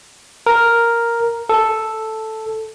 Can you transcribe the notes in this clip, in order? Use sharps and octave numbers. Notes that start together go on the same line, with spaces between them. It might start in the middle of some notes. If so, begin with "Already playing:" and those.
A#4
A4